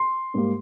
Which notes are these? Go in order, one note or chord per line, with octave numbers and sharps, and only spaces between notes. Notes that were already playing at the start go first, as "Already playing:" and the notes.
Already playing: C6
G#2 G3 A#3